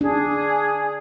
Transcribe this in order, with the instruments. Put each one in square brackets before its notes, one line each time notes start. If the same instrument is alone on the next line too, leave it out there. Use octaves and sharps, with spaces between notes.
[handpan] D4 [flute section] G#4